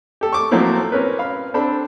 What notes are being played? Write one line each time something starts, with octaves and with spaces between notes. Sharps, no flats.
G4 A4
C#6 D6
F3 F#3 A3 A#3 C4 E4
C4 C#4 A#4 B4
F5 B5
C4 D4 A4 B5